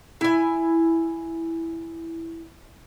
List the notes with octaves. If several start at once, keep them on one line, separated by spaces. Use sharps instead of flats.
E4 G#5